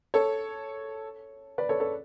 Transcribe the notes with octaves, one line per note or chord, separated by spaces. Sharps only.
A4 C#5
B4 D5
A4 C#5
A4 C#5